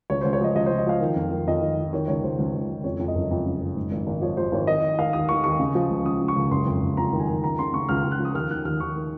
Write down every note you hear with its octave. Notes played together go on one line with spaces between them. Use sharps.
C#2 C#5
C#2 C5
C#5
F3 D#5
C#2 D#5
C#2 C5
D#5
F3 F5
D#3
F2
D#3
F2 D#5
D#3
D#3
D#3 C#5
C#2 C#5
C#2 C5
C#2
C#2
C#2
F2 C#5
F2
D#5
F#1
F2
C#3
F#1
G#2
G#1
G#1
F3 C#5
F3 C5
G#1 C#5
D#3 D#5
D#3
D#3 F5
D#2 D#6
D#3 C#6
D#2 C#6
C#3
F3
C#2
C#2 D#6
C#3
C#6
C#2
F#1 C6
F2
F#1
F2 A#5
D#3
G#5
D#3
C#2 A#5
C#3 C6
C#3 C#6
C#2 F6
C#2
F#6
F3
D#6
D#2 F6
D#3 F#6
D#2 F6
D#2 C#6
D#3